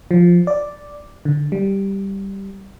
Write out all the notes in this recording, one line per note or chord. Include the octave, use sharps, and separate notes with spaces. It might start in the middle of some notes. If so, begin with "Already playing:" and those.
F3
D5
D3
G3